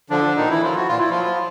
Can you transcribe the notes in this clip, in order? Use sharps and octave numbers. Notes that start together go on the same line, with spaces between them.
D3 F3 D4
A#2 D#3 D#4
E3 E4
F3 F#3 F4
F#4
A#2 F4
E4
F3 F4
F#3